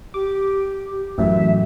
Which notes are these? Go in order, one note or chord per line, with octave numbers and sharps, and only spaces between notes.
G4 D6
A1 F#2 A2 E5